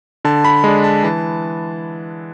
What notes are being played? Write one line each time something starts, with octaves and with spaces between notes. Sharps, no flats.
D3 A5
B5
G#3 D4
A5
E3 A5